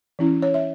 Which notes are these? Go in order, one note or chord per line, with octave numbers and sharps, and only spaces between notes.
E3 C#4 E4
C#5
E5